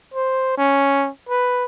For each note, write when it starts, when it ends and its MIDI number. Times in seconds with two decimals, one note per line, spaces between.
0.14 0.57 72
0.57 1.09 61
1.29 1.66 71